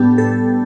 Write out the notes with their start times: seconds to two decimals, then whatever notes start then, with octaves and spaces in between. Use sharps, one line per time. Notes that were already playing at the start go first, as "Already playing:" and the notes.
Already playing: A2 G3 B3 D4 G4 A4
0.18 A2 A4